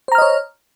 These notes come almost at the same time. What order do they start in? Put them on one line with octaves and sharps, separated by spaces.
C5 A#5 F6 D#5 C#5